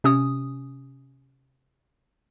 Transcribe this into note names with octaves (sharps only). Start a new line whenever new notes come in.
C3 C#4 D#6